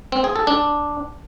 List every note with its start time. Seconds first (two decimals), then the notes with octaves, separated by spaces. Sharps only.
0.12 C4
0.24 G#4
0.36 A4
0.47 D4